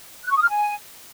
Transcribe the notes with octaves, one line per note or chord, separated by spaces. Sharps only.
F#6
C#6
D#6
F6
G#5